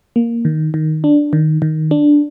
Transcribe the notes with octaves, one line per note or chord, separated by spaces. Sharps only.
A#3
D#3
D#3
D4
D#3
D#3
D4